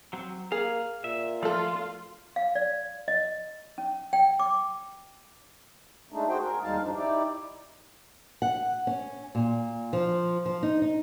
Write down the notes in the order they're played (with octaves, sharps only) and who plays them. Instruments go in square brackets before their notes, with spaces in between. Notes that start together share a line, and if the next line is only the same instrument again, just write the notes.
[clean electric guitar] F#3 C4
[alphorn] A#3 [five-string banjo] G#4 [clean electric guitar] F5
[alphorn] A#2 [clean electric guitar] E5
[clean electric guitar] F3 [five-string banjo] A3 A4 [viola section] F4
[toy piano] F5
D5
D#5
C#4
G5
D6
[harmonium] G#3 A3 D4 D#4
F#4 G#4 C5 G5
G#4 A#4
D#2 G3 G#3 D#4 F5 A5
G2 F3 D4 D#4
D#4 E4 G4 D5
[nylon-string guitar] F#5
C#4
A#2
F3
F3
D#4
D#4